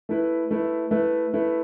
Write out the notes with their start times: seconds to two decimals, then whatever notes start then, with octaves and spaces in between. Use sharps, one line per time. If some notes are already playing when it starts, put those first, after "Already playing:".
0.09 A3 E4 B4
0.51 A3 E4 B4
0.91 A3 E4 B4
1.33 A3 E4 B4